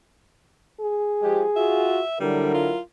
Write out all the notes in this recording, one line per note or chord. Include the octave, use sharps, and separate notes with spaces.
G#4
F3 G#3 G4
F4 F#4 E5
D3 F#3 G3 E4 A#4
F4